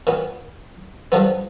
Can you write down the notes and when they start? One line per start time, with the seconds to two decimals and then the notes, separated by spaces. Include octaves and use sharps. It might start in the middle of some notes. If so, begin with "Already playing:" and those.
0.07 A#2 B3
1.12 G2 D3 F3 B3